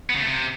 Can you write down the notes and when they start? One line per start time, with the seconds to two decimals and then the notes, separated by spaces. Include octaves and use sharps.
0.10 B3
0.15 C#3
0.21 A3
0.26 C3